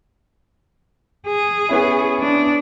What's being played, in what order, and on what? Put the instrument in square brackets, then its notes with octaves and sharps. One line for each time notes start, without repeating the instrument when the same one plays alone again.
[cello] G#4
[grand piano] B3 C#4 E4
[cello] D4